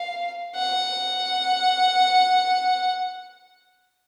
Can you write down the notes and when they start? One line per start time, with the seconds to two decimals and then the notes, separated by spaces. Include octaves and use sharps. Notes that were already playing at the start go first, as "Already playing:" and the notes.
Already playing: F5
0.55 F#5